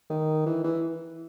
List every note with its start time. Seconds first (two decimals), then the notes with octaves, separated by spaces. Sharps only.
0.10 D#3
0.46 E3
0.64 E3